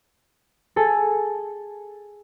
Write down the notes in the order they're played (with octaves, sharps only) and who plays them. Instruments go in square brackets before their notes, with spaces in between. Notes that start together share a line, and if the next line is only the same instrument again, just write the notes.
[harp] G#4 A4 G#5 A5